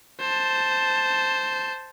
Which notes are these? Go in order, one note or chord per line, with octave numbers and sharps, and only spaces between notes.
C5 A5